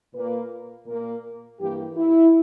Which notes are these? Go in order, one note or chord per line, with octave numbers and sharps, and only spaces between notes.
A#2 A#3 B4
A#2 A#3 A#4
G2 E3 A#3 G4
E4